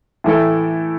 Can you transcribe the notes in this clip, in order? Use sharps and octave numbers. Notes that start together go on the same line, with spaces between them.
A2 E3 A3 E4 A4